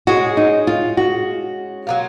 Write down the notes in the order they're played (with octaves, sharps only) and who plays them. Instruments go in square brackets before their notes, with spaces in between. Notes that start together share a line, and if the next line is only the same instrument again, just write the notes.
[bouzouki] G#3 C#4 G#4 [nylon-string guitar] F#4
[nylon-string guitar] D#4
F4
F#4
[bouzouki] F#3 A#3 F4